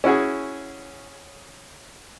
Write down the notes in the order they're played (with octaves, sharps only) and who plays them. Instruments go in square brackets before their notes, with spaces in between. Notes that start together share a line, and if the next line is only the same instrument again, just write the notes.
[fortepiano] C#4 E4 F#4 G#4